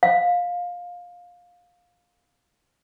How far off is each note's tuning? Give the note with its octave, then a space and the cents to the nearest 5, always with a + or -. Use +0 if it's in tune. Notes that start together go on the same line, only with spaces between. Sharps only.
F5 +20